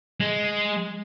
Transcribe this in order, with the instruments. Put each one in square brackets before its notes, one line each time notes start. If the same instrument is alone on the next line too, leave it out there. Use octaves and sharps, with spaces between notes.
[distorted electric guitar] G#3